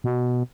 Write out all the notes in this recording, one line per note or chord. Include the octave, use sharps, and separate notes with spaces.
B2